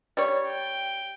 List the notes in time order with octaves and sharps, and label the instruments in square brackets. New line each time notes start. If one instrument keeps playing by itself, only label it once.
[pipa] G3 C#5
[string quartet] G5